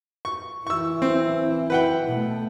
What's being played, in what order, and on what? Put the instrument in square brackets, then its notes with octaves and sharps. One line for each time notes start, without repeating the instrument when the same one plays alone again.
[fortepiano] C#6
[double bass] E3 E4 [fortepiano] C#6 E6
[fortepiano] C4
B4 F#5 G5
[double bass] B2 A3